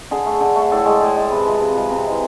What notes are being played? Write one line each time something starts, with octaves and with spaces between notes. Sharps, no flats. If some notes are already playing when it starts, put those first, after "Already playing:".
D3 G#4
A3
D3
A3
A2 A4
G#3
A2
G#3
C3 B4
F3 G#3
C3
F3 G#3
C3 E5
E3 G#3